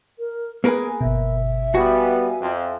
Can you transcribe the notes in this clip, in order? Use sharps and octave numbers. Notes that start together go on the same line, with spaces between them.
A#4
A#3 B3 G#4 A#4 B4 G#5
G1 B2 E5
G3 B3 F#4 F5 G#5
F2